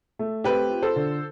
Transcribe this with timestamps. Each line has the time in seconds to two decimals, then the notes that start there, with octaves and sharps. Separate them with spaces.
0.19 A3
0.44 C4 G4 B4
0.70 F4
0.82 A4 C5
0.96 D3